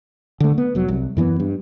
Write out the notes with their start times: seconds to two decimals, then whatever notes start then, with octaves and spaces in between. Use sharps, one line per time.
0.40 D3 A3
0.58 B3
0.75 F1 F#3
0.88 C2
1.17 F#2 E3 A#3 B3
1.40 G2